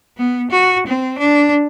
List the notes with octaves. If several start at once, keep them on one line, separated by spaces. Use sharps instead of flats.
B3
F#4
C4
D4